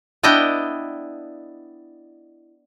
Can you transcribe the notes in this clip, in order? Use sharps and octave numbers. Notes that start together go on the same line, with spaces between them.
B3 D4 E4 D#5 G5